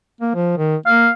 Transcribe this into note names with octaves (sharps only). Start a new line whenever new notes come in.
A#3
F3
D#3
A#3 F5